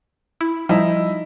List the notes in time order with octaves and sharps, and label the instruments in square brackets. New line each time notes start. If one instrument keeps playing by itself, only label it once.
[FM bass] E4
[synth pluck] F3 [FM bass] G3 [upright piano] D#4 E4